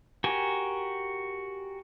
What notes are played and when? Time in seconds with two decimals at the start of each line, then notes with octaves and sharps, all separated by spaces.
0.24 F#4 G4 A#4 G#5